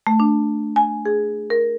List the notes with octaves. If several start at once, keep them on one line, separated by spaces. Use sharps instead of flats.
A3
D4
G#5
G#4
A#4